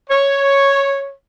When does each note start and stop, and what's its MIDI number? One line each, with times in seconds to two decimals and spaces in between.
0.10 1.10 73